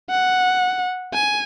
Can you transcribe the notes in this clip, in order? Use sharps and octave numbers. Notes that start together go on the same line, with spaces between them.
F#5
G#5